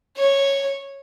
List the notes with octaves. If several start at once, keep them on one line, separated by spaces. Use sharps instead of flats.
C#5